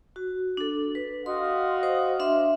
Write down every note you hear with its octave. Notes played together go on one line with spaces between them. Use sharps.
F#4
D4 A4
B4
F#4 D#5 F5 C6
C5
D4 E5 C6